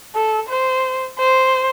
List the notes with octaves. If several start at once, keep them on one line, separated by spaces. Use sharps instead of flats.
A4
C5
C5